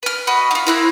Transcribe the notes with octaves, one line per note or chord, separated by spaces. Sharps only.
B4 F6
F#4 B4 D#5
D#4 F4
A#3 C4 E4 F#6